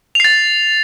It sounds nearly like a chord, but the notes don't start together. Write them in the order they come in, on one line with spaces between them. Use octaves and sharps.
F7 C7 A6